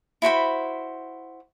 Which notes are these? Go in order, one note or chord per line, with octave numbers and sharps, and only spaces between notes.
E4 F#4 C5 B5